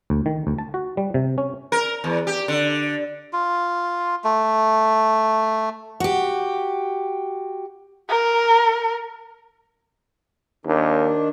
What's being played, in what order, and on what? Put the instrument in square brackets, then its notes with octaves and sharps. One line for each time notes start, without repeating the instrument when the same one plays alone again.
[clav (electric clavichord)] D2
D#3
D2
A5
F#4
G3
C3
C#4
[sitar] A#4
E2
G4
D3
[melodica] F4
A3
[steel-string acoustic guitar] F#4 G4
[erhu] A#4
[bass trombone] D#2 [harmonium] D#3 D4